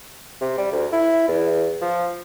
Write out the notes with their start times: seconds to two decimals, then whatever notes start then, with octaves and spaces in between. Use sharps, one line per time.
0.41 C3
0.58 G3
0.72 D2
0.93 E4
1.28 E2
1.82 F3